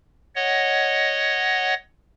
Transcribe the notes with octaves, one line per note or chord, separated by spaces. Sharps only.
C#5 D#5 F#5